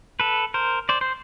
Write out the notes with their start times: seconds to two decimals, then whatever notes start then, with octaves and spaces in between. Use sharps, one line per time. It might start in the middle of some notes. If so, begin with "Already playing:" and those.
0.20 A4 B4
0.54 A#4 C5
0.89 C5 D5
1.01 C5